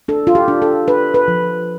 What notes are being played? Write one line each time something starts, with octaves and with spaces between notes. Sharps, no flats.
D4 A4
F4
G4
D4
A4
D4 B4
B4
F3